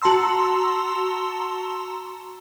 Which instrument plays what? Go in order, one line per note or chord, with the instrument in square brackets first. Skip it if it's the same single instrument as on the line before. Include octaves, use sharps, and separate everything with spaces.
[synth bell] F#4 A5 A#5 C6 E6